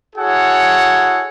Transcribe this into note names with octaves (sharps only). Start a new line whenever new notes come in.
E4 F#4 G#4 A4 C#5 F#5